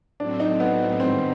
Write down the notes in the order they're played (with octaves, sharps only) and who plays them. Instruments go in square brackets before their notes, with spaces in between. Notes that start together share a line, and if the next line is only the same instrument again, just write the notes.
[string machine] A2 F#3 A3 C4 [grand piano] D4
[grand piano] D#4
B3
[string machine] G#2 D#3 G3 [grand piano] C4